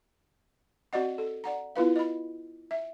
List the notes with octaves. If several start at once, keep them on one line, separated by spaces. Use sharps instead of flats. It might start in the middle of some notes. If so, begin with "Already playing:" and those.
C4 F#4 D5 D#5 F#5
A4
D5 F#5 A#5
B3 E4 F4 B4 F5
D#5 B5
E5